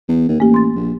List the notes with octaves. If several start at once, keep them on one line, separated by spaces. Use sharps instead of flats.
E2
D#2
A1 A#3 G4
C6 A6
A#1